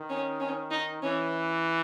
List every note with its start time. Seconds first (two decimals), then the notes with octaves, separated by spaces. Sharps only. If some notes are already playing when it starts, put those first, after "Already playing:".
Already playing: D#3
0.09 C#4
0.40 C#4
0.71 D#4
1.02 E3 C#4